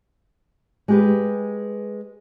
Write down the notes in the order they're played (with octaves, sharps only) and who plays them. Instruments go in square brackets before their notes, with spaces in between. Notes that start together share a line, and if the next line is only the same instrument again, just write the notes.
[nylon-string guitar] G#3 G4 B4